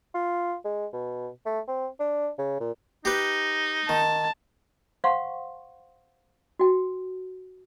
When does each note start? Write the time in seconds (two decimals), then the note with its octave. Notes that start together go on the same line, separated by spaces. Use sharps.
0.14 F4
0.65 G#3
0.93 B2
1.46 A3
1.68 C4
2.00 D4
2.38 C#3
2.60 A#2
3.05 D#4 G4 B4
3.89 D#3 A5
5.04 C5 F5 F#5 C6 C#6
6.59 F#4 G5